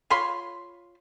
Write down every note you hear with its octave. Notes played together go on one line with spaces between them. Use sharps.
F4 C#5 B5 C6